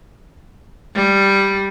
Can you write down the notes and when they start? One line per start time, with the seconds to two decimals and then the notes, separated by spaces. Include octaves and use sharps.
0.95 G3